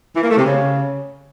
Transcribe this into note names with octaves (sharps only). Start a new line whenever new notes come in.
E3
A#3
A3
C3
C#3